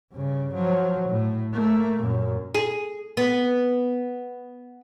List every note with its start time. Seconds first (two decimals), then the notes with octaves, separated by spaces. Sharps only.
0.12 G2 C#3
0.54 F3 F#3
1.08 A2
1.54 A3 A#3
2.00 F#2 A#2
2.55 G#4
3.17 B3